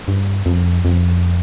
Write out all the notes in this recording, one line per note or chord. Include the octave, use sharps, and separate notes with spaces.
G2
F2
F2